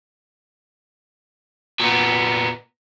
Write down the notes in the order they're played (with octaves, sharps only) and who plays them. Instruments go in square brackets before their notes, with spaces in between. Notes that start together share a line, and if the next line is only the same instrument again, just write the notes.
[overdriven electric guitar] A#2 B3